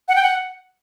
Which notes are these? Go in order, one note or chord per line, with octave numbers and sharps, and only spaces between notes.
F#5
G5
F#5